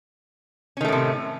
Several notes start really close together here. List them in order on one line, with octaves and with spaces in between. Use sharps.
C#4 D#3 A3 A2 C3